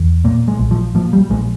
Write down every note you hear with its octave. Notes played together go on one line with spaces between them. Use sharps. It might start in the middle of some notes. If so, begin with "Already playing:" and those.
Already playing: E2
A#2 A#3
G#3
A#1
F3
A#2 F3
G3
A#1 G#3